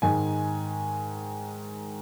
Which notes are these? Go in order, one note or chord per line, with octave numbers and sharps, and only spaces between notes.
G#2 D#3 G#3 D#4 G#5